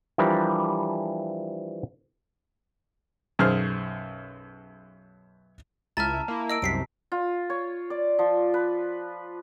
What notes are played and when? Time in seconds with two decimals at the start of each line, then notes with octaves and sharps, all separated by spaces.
0.18 E3 F3 G3 D4 A#4
3.39 B1 F#2 G#4 C5 F6
5.97 C#2 E4 E5 A5 A#5 F6 A6
6.28 A#3 E4
6.50 D#5 E6 D7
6.62 C2 F#2 C3 B6 C7 D7
7.12 F4
7.50 C#5
7.90 D5
8.19 F3
8.54 B4